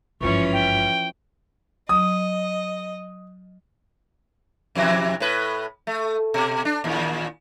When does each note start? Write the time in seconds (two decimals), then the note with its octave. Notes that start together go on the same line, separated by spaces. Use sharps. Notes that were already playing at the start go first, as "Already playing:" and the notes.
0.21 G#1 G2 E3 F3 C#4 C#6
0.53 G5
1.89 F#3 D#5 D#6
4.75 F2 C3 E3
5.20 A2 B4
5.87 A3
6.34 B2
6.65 D4
6.84 D#2 A#2